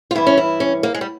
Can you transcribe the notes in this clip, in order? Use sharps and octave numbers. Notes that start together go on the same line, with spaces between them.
F4
G2 E3 E4
C#4
E4
C#4
A#3
G#3
G3